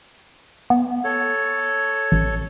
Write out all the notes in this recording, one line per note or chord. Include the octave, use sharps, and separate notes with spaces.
B3
A4 C#5
A1